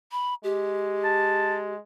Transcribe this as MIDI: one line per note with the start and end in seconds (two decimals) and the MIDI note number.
0.12 0.34 83
0.44 1.78 56
0.44 1.73 67
1.05 1.56 81